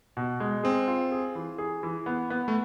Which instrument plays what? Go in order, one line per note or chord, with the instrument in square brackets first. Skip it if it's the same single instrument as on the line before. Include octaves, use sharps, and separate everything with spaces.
[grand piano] B2
G#3
[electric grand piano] C4 [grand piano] G#4
[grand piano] F4
G#4
E3
G#4
E3
B3
B3
[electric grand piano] A3